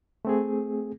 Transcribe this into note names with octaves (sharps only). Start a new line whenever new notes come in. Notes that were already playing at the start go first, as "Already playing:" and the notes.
A3 C4 G#4